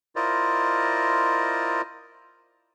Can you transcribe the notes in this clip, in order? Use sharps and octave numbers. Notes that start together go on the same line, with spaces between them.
E4 F4 A#4 C5 D5 D#5